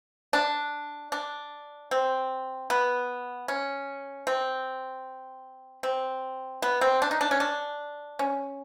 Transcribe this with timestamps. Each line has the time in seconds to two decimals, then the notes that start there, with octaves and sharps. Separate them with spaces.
0.33 D4
1.12 D4
1.91 C4
2.70 B3
3.48 C#4
4.27 C4
5.83 C4
6.62 B3
6.81 C4
7.02 D4
7.11 D#4
7.21 D4
7.31 C#4
7.40 D4
8.19 C#4